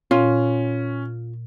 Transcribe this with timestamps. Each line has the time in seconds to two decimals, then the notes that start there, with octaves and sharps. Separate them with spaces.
0.11 A#2 C#4 F4